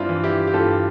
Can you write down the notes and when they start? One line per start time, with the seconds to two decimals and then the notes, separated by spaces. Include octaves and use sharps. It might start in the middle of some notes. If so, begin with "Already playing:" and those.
Already playing: G2 C4 D4 E4 F4
0.09 E3
0.24 E4 G4
0.47 G4
0.54 G2 F4 A4